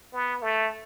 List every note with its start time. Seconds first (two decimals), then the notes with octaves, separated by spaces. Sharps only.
0.13 B3
0.42 A3